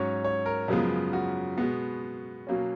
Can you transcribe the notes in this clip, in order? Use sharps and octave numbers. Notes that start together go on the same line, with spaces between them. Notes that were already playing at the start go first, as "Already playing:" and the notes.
Already playing: G#2 F#3 C#4 C#5
C#5
A#4
F#2 C#3 F3 G#3 B3
F#4
B2 G#3 B3
B2 F#3 A#3 C#4